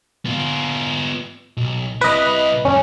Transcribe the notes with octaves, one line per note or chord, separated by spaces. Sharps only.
B3 F4
B1
C3 E4 B4 D#5
F#2 C3 C#4